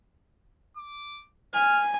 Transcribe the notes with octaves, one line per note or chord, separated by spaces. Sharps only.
D6
G#5 F6